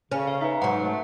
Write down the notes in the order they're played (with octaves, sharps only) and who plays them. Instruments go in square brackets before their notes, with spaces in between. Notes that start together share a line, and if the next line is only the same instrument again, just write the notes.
[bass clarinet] C#3 [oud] C#4
[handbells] F5
[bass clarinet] D#4 [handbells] B4 E5
[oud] G#2 F#3 [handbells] F#5
[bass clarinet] A3